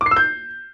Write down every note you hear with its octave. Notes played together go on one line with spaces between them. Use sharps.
D6
C7
E6
G6